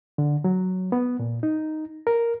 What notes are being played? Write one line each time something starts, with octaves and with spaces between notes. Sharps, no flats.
D3
F#3
B3
A#2
D#4
A#4